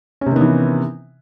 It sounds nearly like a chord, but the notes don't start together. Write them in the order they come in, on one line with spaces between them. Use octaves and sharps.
C#4 C3 D#3 B3 E3